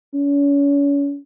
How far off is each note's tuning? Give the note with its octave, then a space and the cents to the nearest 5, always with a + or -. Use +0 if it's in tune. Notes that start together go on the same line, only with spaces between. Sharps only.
C#4 +35